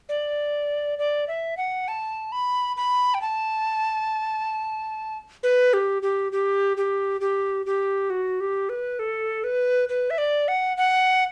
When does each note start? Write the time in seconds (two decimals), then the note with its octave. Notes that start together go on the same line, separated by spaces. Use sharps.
0.09 D5
0.99 D5
1.28 E5
1.57 F#5
1.88 A5
2.32 B5
2.77 B5
3.14 G5
3.21 A5
5.43 B4
5.73 G4
6.02 G4
6.32 G4
6.77 G4
7.21 G4
7.66 G4
8.10 F#4
8.40 G4
8.69 B4
8.99 A4
9.44 B4
9.89 B4
10.10 E5
10.18 D5
10.48 F#5
10.77 F#5